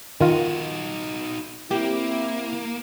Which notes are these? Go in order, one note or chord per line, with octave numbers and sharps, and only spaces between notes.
D#3 D#4 F4 F#4
A#3 C4 E4 G4